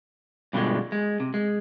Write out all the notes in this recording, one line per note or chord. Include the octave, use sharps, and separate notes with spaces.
G2 B2 D3 E3 F3 G#3
G#3
C3
G#3